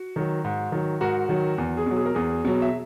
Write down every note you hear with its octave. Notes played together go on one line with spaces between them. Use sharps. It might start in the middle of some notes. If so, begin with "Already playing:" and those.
Already playing: F#4
D#3 F#3
G#2
D#3 F#3
G#2 F#4 A#4
D#3 F#3
E2
G#4
B2 F#3
G#4
A#4
E2 G#4
B2 F#3
E5